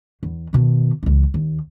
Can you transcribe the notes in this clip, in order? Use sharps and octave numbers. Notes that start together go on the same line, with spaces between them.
E2
B2 D#3
C#2 E3
D#2